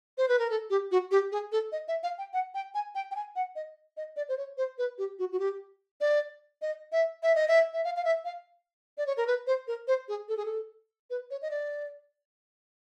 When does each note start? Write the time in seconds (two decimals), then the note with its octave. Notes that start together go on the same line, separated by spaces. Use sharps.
0.18 C5
0.28 B4
0.39 A#4
0.50 A4
0.70 G4
0.91 F#4
1.11 G4
1.32 G#4
1.52 A4
1.72 D#5
1.88 E5
2.03 F5
2.18 G5
2.33 F#5
2.54 G5
2.74 G#5
2.95 G5
3.11 G5
3.16 G#5
3.36 F#5
3.56 D#5
3.97 D#5
4.16 D5
4.29 C5
4.37 C#5
4.57 C5
4.78 B4
4.98 G4
5.19 F#4
5.32 F#4
5.39 G4
6.01 D5
6.62 D#5
6.92 E5
7.23 E5
7.35 D#5
7.48 E5
7.73 E5
7.84 F5
7.97 F5
8.05 E5
8.25 F5
8.98 D5
9.06 C#5
9.17 A#4
9.27 B4
9.47 C5
9.67 A#4
9.88 C5
10.08 G#4
10.28 A4
10.37 G#4
10.45 A4
11.10 B4
11.31 C#5
11.42 D#5
11.51 D5